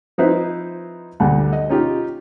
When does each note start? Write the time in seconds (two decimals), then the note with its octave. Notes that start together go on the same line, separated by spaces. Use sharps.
0.18 F3 C4 D#4 E4 B4 C5
1.20 D2 G2 D3
1.53 D#5
1.69 C#4 D#4 F4 G4